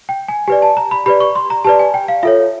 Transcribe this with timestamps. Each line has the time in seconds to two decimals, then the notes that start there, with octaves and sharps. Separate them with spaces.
0.09 G5
0.28 G#5
0.48 G4 B4 D5 G#5
0.62 A5
0.77 A#5
0.91 B5
1.06 G4 B4 D5 B5
1.20 C#6
1.35 C6
1.50 A#5
1.64 G4 B4 D5 A5
1.79 G#5
1.94 G5
2.08 F5
2.23 F4 A4 C#5 E5